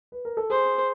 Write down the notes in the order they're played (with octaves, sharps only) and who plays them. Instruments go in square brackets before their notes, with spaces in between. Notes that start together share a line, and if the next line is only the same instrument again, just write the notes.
[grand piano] B4
A#4
A4
[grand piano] G#4 [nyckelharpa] C5